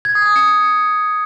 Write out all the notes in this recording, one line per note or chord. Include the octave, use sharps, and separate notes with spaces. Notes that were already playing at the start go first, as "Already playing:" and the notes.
G#6
D#6
D#6
C#7